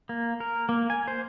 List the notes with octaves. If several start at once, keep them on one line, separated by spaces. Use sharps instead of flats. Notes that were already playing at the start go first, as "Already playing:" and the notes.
A#3
A#4
A#3
G#5
C5